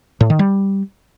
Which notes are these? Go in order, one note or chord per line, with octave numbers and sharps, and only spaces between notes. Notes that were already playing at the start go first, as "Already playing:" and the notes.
A2
D#3
G3